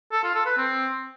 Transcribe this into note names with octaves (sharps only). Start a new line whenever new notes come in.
A4
F4
A4
B4
C4